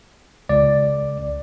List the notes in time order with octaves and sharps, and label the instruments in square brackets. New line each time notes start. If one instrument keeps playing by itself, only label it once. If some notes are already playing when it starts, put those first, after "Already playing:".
[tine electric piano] C#2 D5